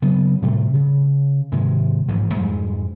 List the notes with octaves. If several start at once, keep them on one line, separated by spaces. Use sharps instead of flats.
C#3 F#3 B3
A2 C3 G3 A3
C#3
G#2 C3 D#3 G#3
A1 G#2 E3 F3
F2 G#2 G3 G#3